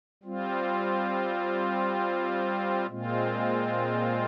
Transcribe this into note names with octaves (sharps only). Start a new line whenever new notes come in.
G3 C4 F4
A#2 G#3 C4 F4